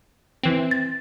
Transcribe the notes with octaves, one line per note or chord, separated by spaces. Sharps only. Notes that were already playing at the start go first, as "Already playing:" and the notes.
E3 C4
A6